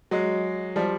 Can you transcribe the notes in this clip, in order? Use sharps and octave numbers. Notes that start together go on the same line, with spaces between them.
F#3 G#3
F3 G3